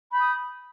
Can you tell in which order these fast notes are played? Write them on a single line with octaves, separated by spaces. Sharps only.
B5 G6 D#6